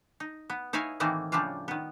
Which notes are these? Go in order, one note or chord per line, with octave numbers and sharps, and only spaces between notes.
D#4
B3
D#4 E4 C#5 F5 G#5
A2 D#3 E3 A3 A#3 C4
A2 C#3 F3 G3 D4 F4
D#3 B3